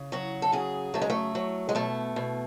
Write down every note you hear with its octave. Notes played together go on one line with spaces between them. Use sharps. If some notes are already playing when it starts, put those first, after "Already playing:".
Already playing: C#3
F#3 F#4
A4
C#3 G#4
F#3 A3
G#3
A3
F#3
G#3
B2 A3
B2